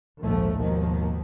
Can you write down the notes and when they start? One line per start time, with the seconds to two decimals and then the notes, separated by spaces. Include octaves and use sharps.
0.21 A#1 D#2 G#2 F3 A3
0.59 G#1 D#2 B2 D#3 F3